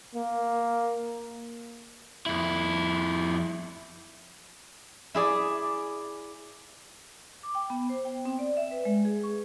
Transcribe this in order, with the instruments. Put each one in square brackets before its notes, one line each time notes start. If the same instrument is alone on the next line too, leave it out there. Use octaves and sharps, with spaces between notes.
[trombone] A#3
[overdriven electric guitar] F2 E4
[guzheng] E4 G#4 D5
[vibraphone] D6
G5
B3
C5
G5
C4
D5
E5
B4
G#3
G#4
C#6